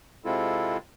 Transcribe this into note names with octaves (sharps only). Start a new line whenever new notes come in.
C3 G#3 C4 E4 F4 A4